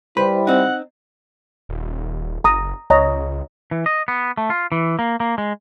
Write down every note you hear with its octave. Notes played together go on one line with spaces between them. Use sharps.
G3 E4 B4 C5 B5
C4 D#4 F#5
D#1
F#1 A#5 D#6
C#2 C#5 D#5 A#5
E3
D#5
B3
A3
F4
E3
A#3
A#3
G#3